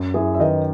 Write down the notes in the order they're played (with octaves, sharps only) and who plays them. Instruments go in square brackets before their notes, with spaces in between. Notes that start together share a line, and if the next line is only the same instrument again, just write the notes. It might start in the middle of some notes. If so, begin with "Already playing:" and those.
Already playing: [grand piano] F#2
[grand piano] F#2 [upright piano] E4 G#4
[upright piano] E5
[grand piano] D#3 [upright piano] B4 D#5